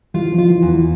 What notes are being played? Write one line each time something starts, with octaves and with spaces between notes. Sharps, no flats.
E3 G3 F4
F3
F4
E3
E2
E3